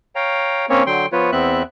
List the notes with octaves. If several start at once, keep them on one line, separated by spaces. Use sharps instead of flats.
C#5 F5 G5 A#5
A#3 C4 C#4 C#5
D3 F#3 G5 C6
F3 B3 F4 B4 C#5
E2 B3 C4 E5 F#6